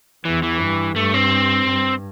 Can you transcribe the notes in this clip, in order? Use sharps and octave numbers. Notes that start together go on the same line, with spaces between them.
E2 E3
E3
G2
G2 A3
C4
G2